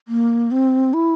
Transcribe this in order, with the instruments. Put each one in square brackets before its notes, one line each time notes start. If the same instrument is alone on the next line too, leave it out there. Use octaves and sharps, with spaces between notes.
[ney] A#3
C4
E4